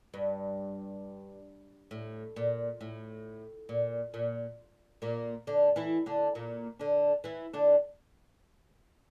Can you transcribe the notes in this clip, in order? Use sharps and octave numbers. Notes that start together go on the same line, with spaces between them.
G2
A2
A#2
A2
A#2
A#2
A#2 A#3
D3 D4
E3 E4
D3 D4
A#2 A#3
D3 D4
E3 E4
D3 D4